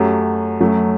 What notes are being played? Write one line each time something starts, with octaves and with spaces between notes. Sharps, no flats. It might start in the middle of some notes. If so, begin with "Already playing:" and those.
Already playing: F#2 F#3 A3 G4
F#2 F#3 A3